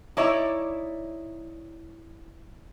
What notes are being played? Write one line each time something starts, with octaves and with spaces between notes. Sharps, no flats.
D#4 E4 C#5 D5 E5